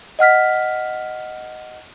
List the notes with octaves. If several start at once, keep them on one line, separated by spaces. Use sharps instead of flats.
D#5 F#5 F6 B6